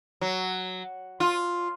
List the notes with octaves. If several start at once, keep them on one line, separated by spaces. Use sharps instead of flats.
F#3
F4